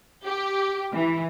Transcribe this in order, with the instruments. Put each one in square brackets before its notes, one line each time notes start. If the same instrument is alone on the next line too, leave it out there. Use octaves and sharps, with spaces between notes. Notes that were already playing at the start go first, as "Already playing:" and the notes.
[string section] G4
E3